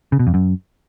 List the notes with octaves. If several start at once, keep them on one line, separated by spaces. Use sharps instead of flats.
C#3
B2
F2
F#2